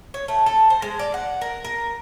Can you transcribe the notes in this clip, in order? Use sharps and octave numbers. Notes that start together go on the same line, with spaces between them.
C#5
A3
A4
C5
G#3
D5
F#5
A#4
A#4